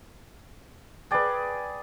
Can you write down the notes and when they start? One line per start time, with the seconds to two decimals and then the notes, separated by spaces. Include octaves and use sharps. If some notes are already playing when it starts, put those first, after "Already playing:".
1.11 G#4 B4 D5 G5